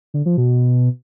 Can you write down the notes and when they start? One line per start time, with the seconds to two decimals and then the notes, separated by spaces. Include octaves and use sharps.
0.14 D3
0.26 F3
0.37 B2